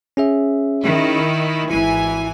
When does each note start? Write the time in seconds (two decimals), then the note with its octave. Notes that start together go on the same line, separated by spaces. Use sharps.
0.17 C#4 G#4 E5
0.83 D#3 E4
1.71 G#1 E3 E4 G#5